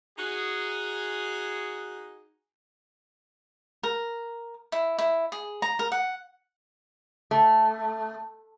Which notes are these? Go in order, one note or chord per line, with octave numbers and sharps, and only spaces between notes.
D#4 F#4 G#4
A#4
E4
E4
G#4
A#5
A#4
F#5
A3